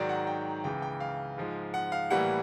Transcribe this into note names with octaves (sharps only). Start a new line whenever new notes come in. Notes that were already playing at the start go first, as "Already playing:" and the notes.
Already playing: G#2 D#3 F#3 D5
F#5
G5
C#2 C#3 E3 G5
G5
F5
G#2 F3 G#3
F#5
F5
A2 E3 G3 A#3 F#5